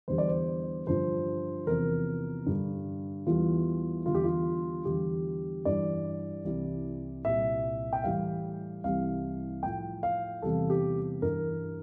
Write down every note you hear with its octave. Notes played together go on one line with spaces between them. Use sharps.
E2 D3 G3 C5
D5
C5
G2 D3 F3 C5
E2 C3 F3 A#4
G2 D3 G3
E2 E3 G3 F4
E2 D3 G3 F4
G4
F4
E2 D3 G3 G4
G2 E3 G3 D5
C2 C3 E3 G3
C2 A#2 G3 E5
G5
A2 E3 G3 F5
C2 C3 E3 G3 F5
A2 F3 G5
F5
E2 C3 G3 A4
G4
G2 E3 G3 A#4